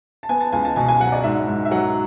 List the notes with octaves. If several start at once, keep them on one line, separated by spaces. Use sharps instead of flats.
A5
B3 G#5
A5
C#2 G#5
A5
B2 G#5
G#5
F#3 F#5
D5
G#2 E5
G#2
E5
F#3 F#5